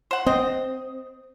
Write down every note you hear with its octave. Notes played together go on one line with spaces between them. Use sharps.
C5 F#5
C4 D#5